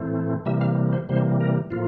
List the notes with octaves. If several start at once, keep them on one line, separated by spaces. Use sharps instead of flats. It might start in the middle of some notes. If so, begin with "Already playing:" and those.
Already playing: A2 E3 A3 C4
C3 E3 G3 A#3 E5
F5
C5
C3 E3 G3 A#3 C5
A#4
A2 F3 A#3 F4